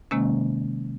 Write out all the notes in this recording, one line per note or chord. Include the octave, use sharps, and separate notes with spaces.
C3 D#3 G#3 A#3 C#4